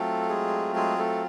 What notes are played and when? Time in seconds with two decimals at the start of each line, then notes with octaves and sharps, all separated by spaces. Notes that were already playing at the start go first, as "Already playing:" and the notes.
Already playing: F#3 A3 C4 F4 A4
0.29 G#3 G#4
0.76 G#3 G#4
0.98 A3 A4